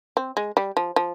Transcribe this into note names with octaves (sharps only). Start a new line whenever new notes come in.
C4
G#3
G3
F3
F3